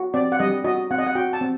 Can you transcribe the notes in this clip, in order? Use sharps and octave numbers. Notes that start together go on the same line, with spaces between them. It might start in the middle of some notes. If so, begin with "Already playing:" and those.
Already playing: F#4
C4 D5
F#5
G3 D#5
F#4 D#5
C4 F#5
D#5
F#5
F#4 G5
A5
C4